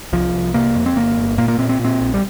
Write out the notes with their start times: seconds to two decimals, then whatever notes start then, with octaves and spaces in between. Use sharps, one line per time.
0.13 C2 F3
0.34 C2
0.54 C3 A#3
0.76 F2
0.86 C4
0.96 G1 A#3
1.17 G1
1.38 A#2 A#3
1.48 A#3
1.58 A#2 C4
1.69 C4
1.79 A#2
1.85 C4
2.00 A#1
2.14 G3